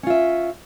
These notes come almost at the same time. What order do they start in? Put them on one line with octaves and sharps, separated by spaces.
C#4 F4 E5